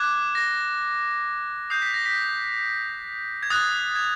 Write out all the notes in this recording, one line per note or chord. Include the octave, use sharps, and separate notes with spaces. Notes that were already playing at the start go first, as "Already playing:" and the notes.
Already playing: D6 F#6 G#6
A#6
D#6 G6 C7
B6
A#6
B6
G#6
D#6 F#6 A6
G#6